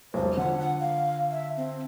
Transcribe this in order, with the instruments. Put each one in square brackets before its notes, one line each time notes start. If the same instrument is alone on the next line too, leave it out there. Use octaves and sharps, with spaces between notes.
[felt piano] E1 B1 [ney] C5
[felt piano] D3 F4 [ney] F#5
[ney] F#5
F5
E5
C4